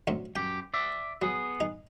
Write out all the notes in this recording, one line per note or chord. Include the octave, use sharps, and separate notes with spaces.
D2 F#3 C4
F#2 G4 G5
D5 E5
F#3 B3 G#4
D#4